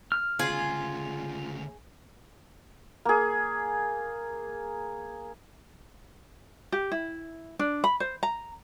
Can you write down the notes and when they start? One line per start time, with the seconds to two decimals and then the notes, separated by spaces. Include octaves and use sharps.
0.12 F6
0.39 D2 C#3 F4 G#4
3.05 A#3 G#4
6.72 G4
6.92 E4
7.59 D4
7.84 B5
8.00 C5
8.23 A#5